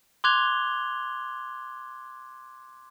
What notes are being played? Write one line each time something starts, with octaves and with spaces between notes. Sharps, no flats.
C6 D6 F#6 G#6 F7 G7